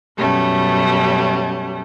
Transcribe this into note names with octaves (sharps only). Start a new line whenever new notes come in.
F#2 B2 G3 A3 C#4